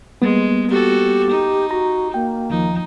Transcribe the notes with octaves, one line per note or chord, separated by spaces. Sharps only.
G3 G#3 A#3 B3
F#4 G4 A4
D#4
F#4 A#5
A#3 G5
D#2 F3 D#4